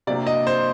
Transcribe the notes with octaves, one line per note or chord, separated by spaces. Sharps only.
C3 F#3 A#3 D4 D5
D#5
C5